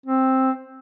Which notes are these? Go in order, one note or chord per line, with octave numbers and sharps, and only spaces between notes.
C4